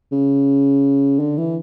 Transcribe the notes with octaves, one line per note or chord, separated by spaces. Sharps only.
C#3
D3
E3